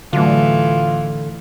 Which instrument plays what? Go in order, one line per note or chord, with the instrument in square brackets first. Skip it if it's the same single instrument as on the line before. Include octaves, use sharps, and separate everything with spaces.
[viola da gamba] A2 E3 [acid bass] D3 [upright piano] F#3 A3 [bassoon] F4